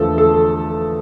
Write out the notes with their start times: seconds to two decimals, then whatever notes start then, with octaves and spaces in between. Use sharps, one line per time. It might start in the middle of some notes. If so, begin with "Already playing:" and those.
Already playing: E2 D3 F3 A3 A4
0.18 A4